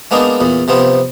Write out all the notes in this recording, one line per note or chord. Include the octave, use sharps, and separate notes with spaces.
G#3 A#3 B3 D4 D#4
E2 A#2
C3 F3 B3 C4